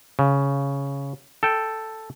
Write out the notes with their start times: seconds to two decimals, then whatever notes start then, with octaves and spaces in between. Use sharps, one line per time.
0.19 C#3
1.43 A4 G5